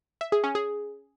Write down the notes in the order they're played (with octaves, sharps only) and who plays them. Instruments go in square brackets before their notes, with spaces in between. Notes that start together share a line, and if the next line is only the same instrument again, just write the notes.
[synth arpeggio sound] E5
G#4
C#4
G#4